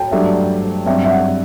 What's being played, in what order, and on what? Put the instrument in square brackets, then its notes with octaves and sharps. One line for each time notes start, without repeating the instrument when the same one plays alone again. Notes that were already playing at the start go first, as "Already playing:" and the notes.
Already playing: [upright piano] G5 A5
[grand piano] G2 F#3 A3 D4 G4 [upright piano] E5
[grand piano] G2 F#3 C4 [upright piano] E5
[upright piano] E5
F#5